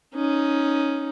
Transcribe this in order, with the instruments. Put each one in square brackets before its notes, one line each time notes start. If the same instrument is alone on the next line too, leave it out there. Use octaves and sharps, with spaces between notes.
[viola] C#4 D#4